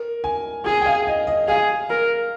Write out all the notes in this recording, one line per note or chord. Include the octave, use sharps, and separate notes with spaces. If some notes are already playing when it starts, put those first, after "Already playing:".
Already playing: A#4
G#5
G#4 G#5
G5
F5
D#5
D#5
G#4 F5
A#4